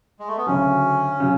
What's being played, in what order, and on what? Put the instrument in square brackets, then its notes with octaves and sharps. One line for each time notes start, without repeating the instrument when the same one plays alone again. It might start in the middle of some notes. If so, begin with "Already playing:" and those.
[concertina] G#3
A3
B3
[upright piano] D2 C#3 F#3 [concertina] C#4
[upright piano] C#3 F#3